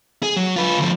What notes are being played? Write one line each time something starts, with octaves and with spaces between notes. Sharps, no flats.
G#4
F#3
F4 B4
D2 F3